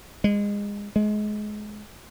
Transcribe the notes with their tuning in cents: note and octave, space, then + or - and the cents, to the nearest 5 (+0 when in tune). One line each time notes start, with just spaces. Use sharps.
G#3 -25
G#3 +25